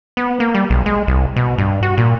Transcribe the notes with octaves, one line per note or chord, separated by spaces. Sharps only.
B3
A#3
G3
B1
G#3
C2
B2
G2
F#4
A#2